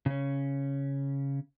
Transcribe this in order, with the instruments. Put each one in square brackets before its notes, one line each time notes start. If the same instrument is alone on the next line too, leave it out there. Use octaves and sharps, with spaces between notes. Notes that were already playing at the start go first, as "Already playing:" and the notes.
[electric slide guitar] C#3 C#4